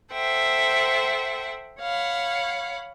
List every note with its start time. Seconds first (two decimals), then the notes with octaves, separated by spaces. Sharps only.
0.12 A4 C5 E5 F#5 G5
1.80 C#5 F5 F#5 B5